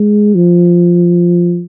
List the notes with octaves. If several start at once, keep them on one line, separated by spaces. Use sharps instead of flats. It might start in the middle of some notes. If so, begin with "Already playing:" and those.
Already playing: G#3
F3